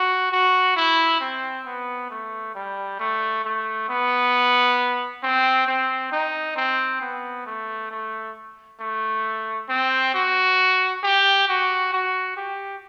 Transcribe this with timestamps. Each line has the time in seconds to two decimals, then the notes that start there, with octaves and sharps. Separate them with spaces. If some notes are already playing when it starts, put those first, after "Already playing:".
Already playing: F#4
0.32 F#4
0.76 E4
1.20 C4
1.66 B3
2.10 A3
2.55 G3
3.00 A3
3.45 A3
3.89 B3
5.23 C4
5.67 C4
6.12 D#4
6.56 C4
7.01 B3
7.46 A3
7.91 A3
8.80 A3
9.69 C4
10.14 F#4
11.03 G4
11.48 F#4
11.93 F#4
12.37 G4